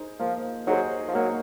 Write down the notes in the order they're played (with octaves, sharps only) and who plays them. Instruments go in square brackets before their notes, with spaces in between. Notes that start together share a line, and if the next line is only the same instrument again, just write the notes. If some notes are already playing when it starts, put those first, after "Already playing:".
Already playing: [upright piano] D#4 G#4 C5
[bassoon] F3 [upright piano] A#3
[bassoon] F#3 [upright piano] D#4 G#4 C5
[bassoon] F3
[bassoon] F#3 [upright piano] A#3